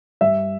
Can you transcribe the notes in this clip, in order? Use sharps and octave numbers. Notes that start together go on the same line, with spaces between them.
G2 E5